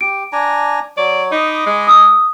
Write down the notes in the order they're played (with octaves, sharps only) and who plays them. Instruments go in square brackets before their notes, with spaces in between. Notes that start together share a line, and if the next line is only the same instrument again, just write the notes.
[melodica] G4 [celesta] D7
[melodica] D4 G#5 A#5
[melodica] F#3 C#5 [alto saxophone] D5
[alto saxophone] D#4 [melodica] D#5 B5 D6
[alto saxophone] G#3
[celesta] D#6 E6